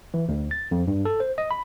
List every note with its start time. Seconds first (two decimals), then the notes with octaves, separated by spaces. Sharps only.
0.14 E3
0.29 D2
0.51 A6
0.71 F2
0.87 G2
1.05 A4
1.20 C5
1.38 D#5
1.51 B5